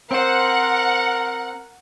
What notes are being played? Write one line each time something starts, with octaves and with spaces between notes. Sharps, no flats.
C4 A#4 C5 F#5